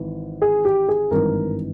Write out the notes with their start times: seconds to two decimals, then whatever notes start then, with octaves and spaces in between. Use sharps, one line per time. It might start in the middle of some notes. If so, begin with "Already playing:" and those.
Already playing: G#1 E3
0.42 G#4
0.65 G4
0.89 G#4
1.11 G#1 G2 E3 A#4